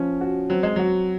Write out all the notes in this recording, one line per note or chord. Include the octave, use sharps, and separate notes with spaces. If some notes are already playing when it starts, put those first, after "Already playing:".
Already playing: F3 C#4
F#4
F#3 C4
G#3
F#3 F#4